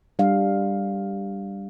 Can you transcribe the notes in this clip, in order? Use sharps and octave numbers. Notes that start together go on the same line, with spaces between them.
G3 D4 F5